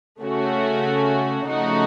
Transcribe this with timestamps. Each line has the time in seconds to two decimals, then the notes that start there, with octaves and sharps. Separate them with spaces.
0.21 C#3 A3 C#4 F#4
1.48 C#3 F3 A3 D#4 F#4